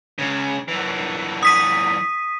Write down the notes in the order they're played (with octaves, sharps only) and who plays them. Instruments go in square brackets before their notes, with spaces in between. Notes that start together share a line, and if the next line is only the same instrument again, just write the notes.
[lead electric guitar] C#2 C#3
F#2 E3
[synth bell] D#6 B6 D#7